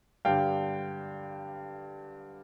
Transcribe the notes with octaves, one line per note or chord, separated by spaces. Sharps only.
G2 D3 G3 F5 G5